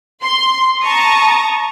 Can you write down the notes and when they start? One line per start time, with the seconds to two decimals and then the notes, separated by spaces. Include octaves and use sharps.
0.22 C6
0.82 A5 A#5 C#6 D#6